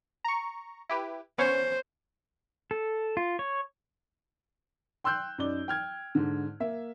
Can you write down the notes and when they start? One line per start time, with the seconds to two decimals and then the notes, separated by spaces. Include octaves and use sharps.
0.24 A#5 C#6
0.89 E4 G4 B4
1.38 B3 C#4 C5 C#5
2.71 A4
3.17 F4
3.39 C#5
5.04 G5 C6 E6 F#6 G6
5.38 F#2 D#4 D5 G7
5.68 G5 F6 G#6
6.15 G#2 D3
6.60 A#3 E5